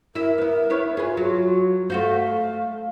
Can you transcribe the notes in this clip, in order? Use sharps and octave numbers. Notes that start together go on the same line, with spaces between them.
E4 A#4 E5
B3 E4
B3 E4 C#5
F4 G#4 B4
F#3
A3 F#4 C5 F5